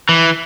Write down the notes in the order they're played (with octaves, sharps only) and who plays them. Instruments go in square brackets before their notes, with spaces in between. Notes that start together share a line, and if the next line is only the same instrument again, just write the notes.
[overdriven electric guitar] E3